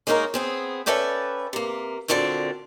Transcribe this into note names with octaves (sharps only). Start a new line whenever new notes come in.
G#3 A#3 C#4 D#4 G4 A#4
B3 C4 G#4
C#4 A4 B4 D5 E5 G5
C3 A#3
D2 A#2 D3 C4 G#4 D5